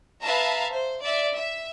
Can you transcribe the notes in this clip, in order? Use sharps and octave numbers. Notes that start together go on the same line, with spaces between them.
B4 E5 F5 A5 A#5
C5
D5 E5
E5